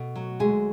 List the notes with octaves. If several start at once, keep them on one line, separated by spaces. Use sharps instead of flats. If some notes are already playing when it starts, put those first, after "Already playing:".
Already playing: B2 A3
F#3
D2 G#3 G#4